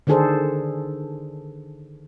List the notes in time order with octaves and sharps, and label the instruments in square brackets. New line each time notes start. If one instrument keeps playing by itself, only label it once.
[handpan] D3 D#3 D4 G#4 A4 C5